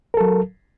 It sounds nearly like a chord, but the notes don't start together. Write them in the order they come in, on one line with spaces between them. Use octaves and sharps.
A#4 A4 F#3